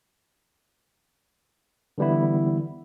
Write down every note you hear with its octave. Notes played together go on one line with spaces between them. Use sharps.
D3 E3 G3 B3 E4